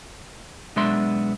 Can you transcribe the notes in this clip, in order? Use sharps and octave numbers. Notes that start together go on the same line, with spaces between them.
B1 G#3 B3 D4 E5 C6